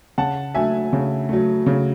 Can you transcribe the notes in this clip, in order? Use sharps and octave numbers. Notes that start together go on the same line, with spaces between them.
C#3 F#5 A5
F#3 A3 E5 G#5
C#3
F#3 A3
C#3